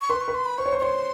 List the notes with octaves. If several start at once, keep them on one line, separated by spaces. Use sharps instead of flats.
C#6
B4 C6
C#6
B4
C6
B5
C5 C#6
C#5
C5
C#6
C#5 C6